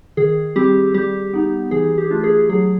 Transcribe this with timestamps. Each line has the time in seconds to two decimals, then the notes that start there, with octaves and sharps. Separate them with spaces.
0.17 D#3 G#4
0.56 G3 C4 G4
0.94 G3 G4
1.33 B3 D#4
1.71 E3 G#4
1.98 G4
2.11 A3 D4 F4
2.24 G#4
2.49 F#3 G#4